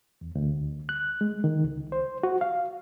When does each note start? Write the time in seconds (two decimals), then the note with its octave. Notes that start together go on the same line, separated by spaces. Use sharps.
0.21 E2
0.35 D2
0.89 F#6
1.21 G#3
1.44 D#3
1.64 C#2
1.92 C5
2.23 F#4
2.41 F5